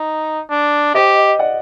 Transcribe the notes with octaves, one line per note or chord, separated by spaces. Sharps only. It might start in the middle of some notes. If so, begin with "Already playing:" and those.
Already playing: D#4
D4
G4 C5 D#5
D5 F#5